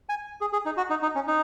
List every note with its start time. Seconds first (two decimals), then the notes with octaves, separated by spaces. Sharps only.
0.09 G#5
0.41 G#4
0.53 G#4
0.65 D#4
0.77 F#4
0.90 D#4
1.02 D#4
1.15 C#4
1.28 D#4